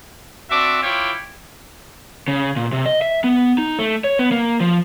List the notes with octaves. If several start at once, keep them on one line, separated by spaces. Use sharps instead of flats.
C4 D4 F#4 E5 D6
E4 F4 C#5 G5 D6
C#3
A#2
C3
D#5
E5
B3
D#4
A3
C#5
B3
A#3
F3